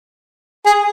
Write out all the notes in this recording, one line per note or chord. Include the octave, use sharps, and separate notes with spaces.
G#4